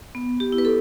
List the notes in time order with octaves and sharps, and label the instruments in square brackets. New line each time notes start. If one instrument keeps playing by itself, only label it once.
[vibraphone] B3
G4
E4
B4
A4